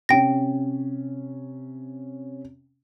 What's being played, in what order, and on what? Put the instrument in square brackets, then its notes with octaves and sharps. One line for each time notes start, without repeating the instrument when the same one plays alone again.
[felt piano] C3 C#4 [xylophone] G5 A#6